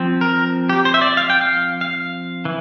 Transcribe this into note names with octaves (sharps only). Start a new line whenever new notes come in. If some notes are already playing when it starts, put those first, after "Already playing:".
Already playing: F3 C4
A#4
G4
C5
E5
D5
F5
G5
F5
F5
E3